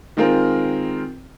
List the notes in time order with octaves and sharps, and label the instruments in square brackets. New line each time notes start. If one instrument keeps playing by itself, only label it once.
[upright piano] D#3 G#3 C4 F4 A#4